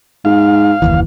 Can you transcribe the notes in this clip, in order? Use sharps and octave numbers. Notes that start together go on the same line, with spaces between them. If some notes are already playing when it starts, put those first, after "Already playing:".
G#2 F5
F#1 D#2 E3